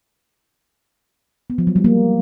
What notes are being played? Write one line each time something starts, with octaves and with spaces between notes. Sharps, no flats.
B3
F3
F#3
G3
A#3